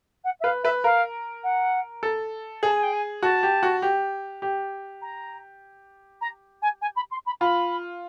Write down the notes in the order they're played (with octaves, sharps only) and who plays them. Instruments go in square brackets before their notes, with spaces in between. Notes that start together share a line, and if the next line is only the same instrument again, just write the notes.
[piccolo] F#5
E5
[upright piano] B4 [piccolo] F5
[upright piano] B4 [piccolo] E5
[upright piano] A#4 [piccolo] F5
[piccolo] F#5
[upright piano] A4
[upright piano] G#4 [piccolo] A5
[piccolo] G#5
G5
G#5
[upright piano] F#4 [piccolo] A5
[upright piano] G4
F#4
G4
G4
[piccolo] A#5
A#5
G#5
G#5
B5
C6
B5
[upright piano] F4 [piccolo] B5